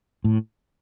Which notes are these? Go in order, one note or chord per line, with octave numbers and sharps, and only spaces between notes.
A2